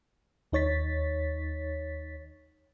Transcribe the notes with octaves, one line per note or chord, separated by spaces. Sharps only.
D#2 D#4 C#5 A6 B6